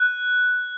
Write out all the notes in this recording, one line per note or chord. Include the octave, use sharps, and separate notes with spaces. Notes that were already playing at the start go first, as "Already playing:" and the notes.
Already playing: F#6